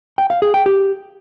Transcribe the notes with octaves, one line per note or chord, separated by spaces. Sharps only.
G5
F5
G#4
G5
G4